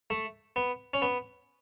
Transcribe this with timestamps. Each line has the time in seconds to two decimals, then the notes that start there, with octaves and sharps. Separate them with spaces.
0.10 A3
0.56 B3
0.94 C#4
1.02 B3